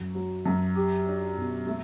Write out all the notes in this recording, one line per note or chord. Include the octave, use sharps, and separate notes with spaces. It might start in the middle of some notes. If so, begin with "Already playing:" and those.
Already playing: F#2
F#3
F#2
G4
D4
B2
A3